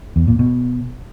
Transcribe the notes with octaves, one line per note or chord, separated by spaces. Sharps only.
E2
A#2
B2